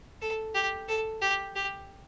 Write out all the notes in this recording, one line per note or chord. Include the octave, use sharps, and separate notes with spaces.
A4
G4
A4
G4
G4